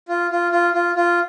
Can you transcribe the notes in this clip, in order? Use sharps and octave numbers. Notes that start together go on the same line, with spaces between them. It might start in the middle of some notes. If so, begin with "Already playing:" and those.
F4
F4
F4
F4
F4